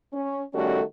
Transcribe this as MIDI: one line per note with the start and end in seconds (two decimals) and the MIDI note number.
0.13 0.42 61
0.54 0.81 51
0.54 0.81 55
0.54 0.81 57
0.54 0.81 61
0.54 0.81 66
0.54 0.81 69